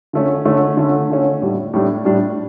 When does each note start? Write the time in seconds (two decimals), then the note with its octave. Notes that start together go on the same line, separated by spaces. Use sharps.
0.13 D3 A3 C#4
0.45 D3 A3 C#4
0.77 D3 A3 C#4
1.10 D3 A3 C#4
1.42 A2 G3 D4
1.73 A2 G3 D4
2.05 A2 G3 D4